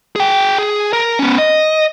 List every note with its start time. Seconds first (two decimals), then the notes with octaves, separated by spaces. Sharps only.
0.16 G#4 G5
0.58 G#4
0.93 A#4
1.19 B3 C#4
1.38 D#5